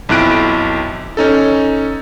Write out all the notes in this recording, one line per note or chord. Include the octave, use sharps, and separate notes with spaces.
B1 F2 E4 F#6 D7
C#4 D#4 A4